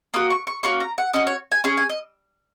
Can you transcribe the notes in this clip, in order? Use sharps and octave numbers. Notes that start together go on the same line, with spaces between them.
A#3 F#4 D#6
C#6
C#6
A#3 C#4 F#4 C#6
A#5
F#5
C#4 F#4 D#5
C#5
G#5
C#4 G#4 G#5
G#5
D#5